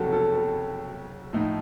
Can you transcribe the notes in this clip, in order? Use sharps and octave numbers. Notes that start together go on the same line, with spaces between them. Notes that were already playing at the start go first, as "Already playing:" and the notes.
Already playing: F#1 F2 C3 F#3 F#4 A4
A4
A4
A2 F3 A3 D#4